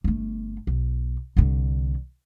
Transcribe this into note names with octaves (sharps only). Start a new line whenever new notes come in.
G1 A3
B1
C2 D3